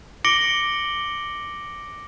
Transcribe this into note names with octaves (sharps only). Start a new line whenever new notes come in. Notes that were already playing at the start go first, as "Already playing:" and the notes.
D6 A#6 C#7 D7 F#7 G7